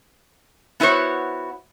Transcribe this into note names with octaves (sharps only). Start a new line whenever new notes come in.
B3 E4 F#4 C5 C#5